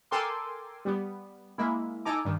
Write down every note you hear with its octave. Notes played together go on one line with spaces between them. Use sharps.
A4 A#4 G5 G#5 C6 D6
G3 B3
G#3 A#3 E4
D#4 A4 G#5 A#5 D6
G2 D#3